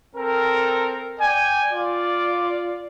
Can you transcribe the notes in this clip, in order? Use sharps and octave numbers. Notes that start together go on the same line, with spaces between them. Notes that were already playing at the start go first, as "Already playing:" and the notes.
C4 A4 A#4
D5 G5 G#5
F4 D5